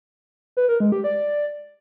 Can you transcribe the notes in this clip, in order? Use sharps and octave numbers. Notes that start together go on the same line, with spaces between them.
B4
A#4
G#3
G4
D5